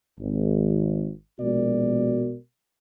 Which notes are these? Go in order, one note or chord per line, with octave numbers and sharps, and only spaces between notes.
G#1
A#1 B2 G#3 F#4 A#4 D5